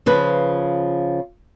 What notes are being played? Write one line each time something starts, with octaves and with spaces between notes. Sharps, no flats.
C#3 F3 B4